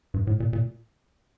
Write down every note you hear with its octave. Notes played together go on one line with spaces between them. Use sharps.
G2
A2
A#2
A#2